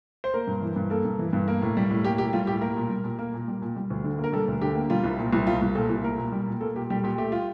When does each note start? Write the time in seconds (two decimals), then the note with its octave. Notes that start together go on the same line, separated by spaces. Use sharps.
0.24 C5
0.34 A#3 A#4
0.47 G2
0.62 E3
0.76 G2
0.90 A#3 A4
1.05 G2
1.19 E3
1.33 G2
1.48 A#3
1.62 A2
1.77 G3
1.91 A2
2.04 A#3 G4
2.18 A2 G4
2.33 G3 F4
2.47 A2 G4
2.61 A#3 A#4
2.76 A#2
2.90 G3
3.04 A#2
3.19 A#3
3.34 A#2
3.48 G3
3.62 A#2
3.76 G3
3.90 D2
4.04 D3
4.19 A#3
4.24 A#4
4.32 G3 A4
4.48 D2
4.62 D3 G4
4.75 A#3
4.90 G3 F4
5.04 C2
5.19 A#2
5.33 C2
5.47 G3 F4
5.62 C2
5.75 A#2 A4
5.89 C2
6.04 A#3 A#4
6.18 A#2
6.32 G3
6.48 A#2
6.61 A#3 A4
6.76 A#2 G4
6.90 G3 G4
7.03 A#2 G4
7.18 A3 G4
7.32 F4